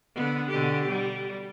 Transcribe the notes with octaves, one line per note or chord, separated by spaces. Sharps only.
D3 B3
B2 D3 G4
G3